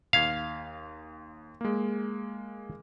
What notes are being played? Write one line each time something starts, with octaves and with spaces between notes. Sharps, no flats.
D#2 F5 G#6 B6
G#3 A#3